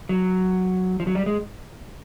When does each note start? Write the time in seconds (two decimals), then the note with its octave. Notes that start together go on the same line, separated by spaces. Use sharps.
0.09 F#3
1.00 F3
1.07 F#3
1.15 G3
1.26 G#3